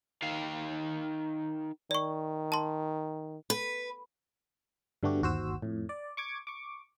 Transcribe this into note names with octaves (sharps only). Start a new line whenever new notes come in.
D#3 F5
D#3 D5 C#6
A5 C6
B4
G2 D3 A3 B3 F#4 G4
G1 D#2 F#4 C5 E6
F2 A2
D5
C#6 D6 G#6
C#6 D6